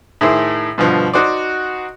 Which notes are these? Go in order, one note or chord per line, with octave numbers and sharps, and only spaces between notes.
A2 D#3 E4 G#4 C5 E6
G2 B2 D3 F3
D#4 F#4 C5 D5